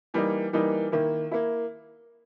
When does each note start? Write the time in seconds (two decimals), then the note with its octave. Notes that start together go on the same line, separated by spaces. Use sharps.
0.14 E3 G3 A#3 D#4
0.53 E3 G3 A#3 D#4
0.92 D#3 A#3 E4
1.31 A#3 E4